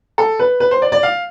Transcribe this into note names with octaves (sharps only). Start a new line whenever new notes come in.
A4
B4
B4
C5
D5
D5
F5